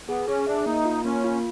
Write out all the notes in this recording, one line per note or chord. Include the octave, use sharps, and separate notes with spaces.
B3 G#4
C#4 G#4
D4 E5
A#3 D#4
F4
A#3 C#4
F4